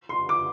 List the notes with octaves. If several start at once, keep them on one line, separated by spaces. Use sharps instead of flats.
C6
D6